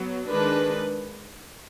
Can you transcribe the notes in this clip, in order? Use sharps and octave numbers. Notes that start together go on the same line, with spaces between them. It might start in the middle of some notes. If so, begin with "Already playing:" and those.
Already playing: F#3 B3
D#3 G#3 D4 B4